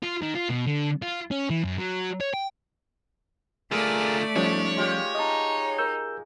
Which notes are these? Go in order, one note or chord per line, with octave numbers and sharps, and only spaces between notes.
F4
D#3
F4
B2
D3
F4
C#4
E3
F#2
F#3
C#5
G5
D3 A3 F4 G#4 A#4 D5
G2 F3 G3 C#4 C#5
G#3 F4 G4
D#4 D#5 A5
A#4 E6 G6